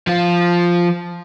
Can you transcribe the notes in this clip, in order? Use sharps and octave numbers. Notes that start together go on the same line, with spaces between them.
F3 F4